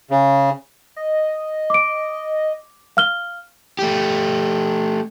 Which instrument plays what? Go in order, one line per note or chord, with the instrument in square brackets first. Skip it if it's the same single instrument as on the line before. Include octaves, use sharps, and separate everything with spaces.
[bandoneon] C#3
[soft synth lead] D#5
[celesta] D6 D7
F5 F6 G7
[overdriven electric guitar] A3 G4